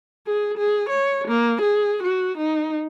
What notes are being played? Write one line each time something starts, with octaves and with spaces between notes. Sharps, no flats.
G#4
G#4
C#5
A#3
G#4
F#4
D#4